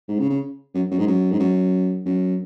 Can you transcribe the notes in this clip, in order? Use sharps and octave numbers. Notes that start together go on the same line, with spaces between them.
G#2
C#3
C#3
F#2
F#2
G#2
F#2
G#2
F#2
F#2